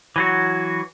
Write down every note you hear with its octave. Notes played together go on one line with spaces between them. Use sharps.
E3 F#3 F#4